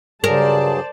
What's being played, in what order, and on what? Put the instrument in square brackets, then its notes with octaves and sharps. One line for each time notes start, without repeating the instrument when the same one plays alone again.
[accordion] G2 F#3 G#4 [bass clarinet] C#3 [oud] A#4 [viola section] C5 D5 A5